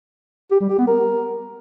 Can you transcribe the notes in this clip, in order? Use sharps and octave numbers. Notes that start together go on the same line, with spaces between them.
G4
G3
G4
B3
A#4